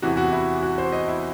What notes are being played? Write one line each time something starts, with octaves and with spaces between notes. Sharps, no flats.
E2 C3 E3 F#4
F#4
E4
F#4
C5
D#5
E4